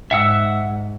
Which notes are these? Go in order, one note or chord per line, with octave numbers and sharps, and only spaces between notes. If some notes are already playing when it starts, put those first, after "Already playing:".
G#2 E5 F#5 E6